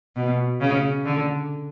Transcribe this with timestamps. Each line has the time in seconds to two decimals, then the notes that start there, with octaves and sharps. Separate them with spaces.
0.16 B2
0.61 C#3
1.05 D3